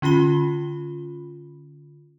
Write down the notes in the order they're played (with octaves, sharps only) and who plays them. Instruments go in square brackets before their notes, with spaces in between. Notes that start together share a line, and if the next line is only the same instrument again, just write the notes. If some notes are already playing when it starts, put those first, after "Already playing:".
[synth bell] D3 C#4 F4 B5 G7